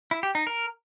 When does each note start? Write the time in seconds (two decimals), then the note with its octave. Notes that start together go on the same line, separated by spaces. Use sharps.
0.11 E4
0.23 G4
0.35 D#4
0.47 A#4